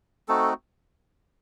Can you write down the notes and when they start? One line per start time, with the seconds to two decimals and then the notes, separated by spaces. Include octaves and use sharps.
0.28 A3 C4 D#4 F#4 A4